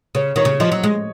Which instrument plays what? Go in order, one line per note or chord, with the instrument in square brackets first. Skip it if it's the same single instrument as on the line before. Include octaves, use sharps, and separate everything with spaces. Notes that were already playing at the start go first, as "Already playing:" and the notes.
[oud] C#3 [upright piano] C#5
[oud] D#3 [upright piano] C#5
[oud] C#3
[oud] F3 [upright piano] D#5
[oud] F#3
G#3